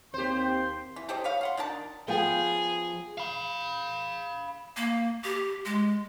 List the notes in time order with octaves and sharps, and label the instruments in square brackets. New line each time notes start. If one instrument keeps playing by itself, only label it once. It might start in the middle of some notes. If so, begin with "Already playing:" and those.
[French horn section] D#2 C4 [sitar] G4 C5 [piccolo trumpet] C6
[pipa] E3
G4 A4 C5 D#5
B4 C#5 F5
F5 F#5 C6
D#3 D4 A#4 A5
[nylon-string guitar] F3 B3 G5 [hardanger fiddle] G#4
[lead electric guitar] F5 B5
[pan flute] A#3
G4
G#3